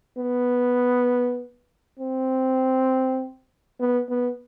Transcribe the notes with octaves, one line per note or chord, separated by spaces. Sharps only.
B3
C4
B3
B3